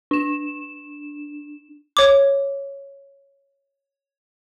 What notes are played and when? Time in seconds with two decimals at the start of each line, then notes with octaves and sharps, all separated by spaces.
0.11 D4 E7
1.97 C#5 D6